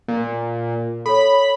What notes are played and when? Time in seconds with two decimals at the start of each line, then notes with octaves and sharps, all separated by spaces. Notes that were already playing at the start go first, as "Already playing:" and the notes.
0.08 A#2
1.06 A4 C#5 B5